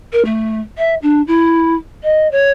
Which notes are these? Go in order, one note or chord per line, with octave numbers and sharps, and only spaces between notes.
A#4
A3
E5
D4
E4
D#5
C#5